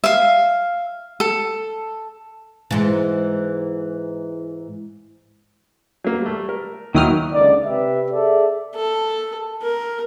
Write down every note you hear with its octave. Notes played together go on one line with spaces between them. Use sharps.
E5 F5
A4
G#2 E3
F#3 A#3
G3 A3
A#4
D#2 D#3 F#3 D#4 E4 G5 D#6 F6
C#2 D3 D#4 D5
C3 G4 B4 E5
G#4 A4 D5 E5
A4
A#4